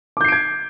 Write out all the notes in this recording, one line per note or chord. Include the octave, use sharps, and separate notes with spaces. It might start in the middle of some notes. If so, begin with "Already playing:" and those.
D6 G6 G#6 C7 D7